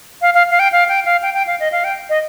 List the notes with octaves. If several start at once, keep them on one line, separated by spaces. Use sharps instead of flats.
F5
F5
F5
G5
F5
G5
F5
G5
G5
F5
D#5
F5
G5
D#5